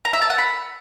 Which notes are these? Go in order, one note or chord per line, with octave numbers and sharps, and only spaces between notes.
A#5
E5
A5
F#5
B5